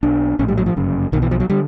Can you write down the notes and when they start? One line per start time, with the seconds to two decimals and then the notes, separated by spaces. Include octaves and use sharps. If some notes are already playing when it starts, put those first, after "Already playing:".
0.03 B1 B2 D4
0.39 A#1 A2 C#4
0.48 G3
0.57 F#3
0.66 F3
0.76 G1 F#2 C#3
1.12 B1 B2 D#3
1.22 E3
1.31 F3
1.40 F#3
1.50 D3 G3